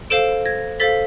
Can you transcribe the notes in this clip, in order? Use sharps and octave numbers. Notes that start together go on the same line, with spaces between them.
A4 C5 F5 D7 E7
G#6 A#6
A4 C5 F5 A6 B6